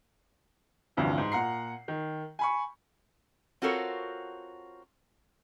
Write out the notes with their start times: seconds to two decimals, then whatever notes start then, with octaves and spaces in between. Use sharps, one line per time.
0.97 A1 D2 G2 C3 F3
1.18 G#2
1.32 A#2 F#5 A#5 C7
1.88 D#3
2.39 G#5 B5 C#6
3.62 C4 F4 F#4 A4 A#4 C#5